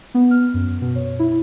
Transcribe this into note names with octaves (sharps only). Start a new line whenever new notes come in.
B3
F6
F#2
B2
C#5
E4